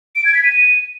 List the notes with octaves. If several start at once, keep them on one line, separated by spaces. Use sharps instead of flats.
D7
G#6
B6
D#7